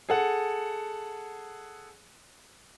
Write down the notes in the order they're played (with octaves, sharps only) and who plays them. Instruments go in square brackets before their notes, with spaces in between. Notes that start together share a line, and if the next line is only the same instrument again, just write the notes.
[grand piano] G#4 A4 F#5